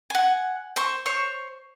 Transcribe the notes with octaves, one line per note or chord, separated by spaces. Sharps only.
F#5 G#5
C5 C6 C#6
C5 C#5 C#6